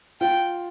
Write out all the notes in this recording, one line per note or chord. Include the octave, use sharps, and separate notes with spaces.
F4 G5